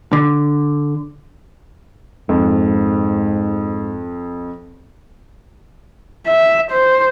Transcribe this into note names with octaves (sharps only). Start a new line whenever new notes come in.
D3
F2 G#2
E5
C5